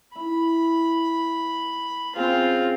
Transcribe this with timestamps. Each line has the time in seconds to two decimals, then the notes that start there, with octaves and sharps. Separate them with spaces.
0.15 E4 B5
2.16 C#3 C4 F4